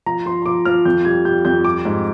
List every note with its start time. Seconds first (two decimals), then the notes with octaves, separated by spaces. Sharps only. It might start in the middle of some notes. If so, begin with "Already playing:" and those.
0.06 F3 A#5
0.26 F3 C6
0.42 C6
0.46 F3 D6
0.65 F3 F6
0.85 F2 G6
1.05 G3 G#6
1.25 G3 G6
1.45 F2 G6
1.64 G3 D6
1.85 G#2